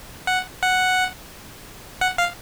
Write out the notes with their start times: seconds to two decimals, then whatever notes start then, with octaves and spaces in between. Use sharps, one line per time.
0.27 F#5
0.62 F#5
2.01 F#5
2.18 F5